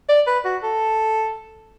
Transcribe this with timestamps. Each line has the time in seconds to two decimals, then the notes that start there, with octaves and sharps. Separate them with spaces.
0.09 D5
0.27 B4
0.45 F#4
0.63 A4